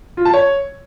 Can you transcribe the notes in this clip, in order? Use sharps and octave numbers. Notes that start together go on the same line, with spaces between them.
F4
A5
C#5